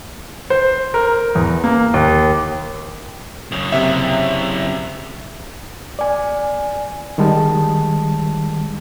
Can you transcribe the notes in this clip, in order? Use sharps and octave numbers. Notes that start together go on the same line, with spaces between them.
C5
A#4
E2
A#3
D#2
F#2 C#3
C3 E5
D5 G#5
D#3 G3 G#3 A5